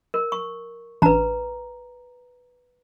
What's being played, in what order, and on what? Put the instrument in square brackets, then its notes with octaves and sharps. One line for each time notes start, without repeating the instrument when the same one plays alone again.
[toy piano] A#4
C#6
[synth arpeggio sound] A1 D4 [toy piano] B4 A#5